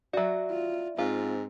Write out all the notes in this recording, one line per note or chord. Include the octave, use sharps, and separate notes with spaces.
F#3 F#4 D5 E5
F4
G#2 C4 F4